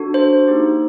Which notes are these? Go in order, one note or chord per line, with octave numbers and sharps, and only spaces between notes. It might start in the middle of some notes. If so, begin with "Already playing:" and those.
Already playing: D4 F#4 A4
C5
A#3 D#4 G4